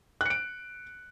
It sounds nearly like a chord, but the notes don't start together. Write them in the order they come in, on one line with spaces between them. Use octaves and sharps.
F#6 C#7 D7